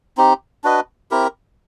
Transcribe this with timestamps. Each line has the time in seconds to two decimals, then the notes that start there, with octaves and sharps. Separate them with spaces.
0.17 C4 D#4 G4
0.64 D4 F#4 B4 D#5
1.11 C4 E4 G4 A#4